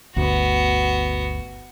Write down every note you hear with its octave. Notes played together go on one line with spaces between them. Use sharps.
G1 D2 B3 F#4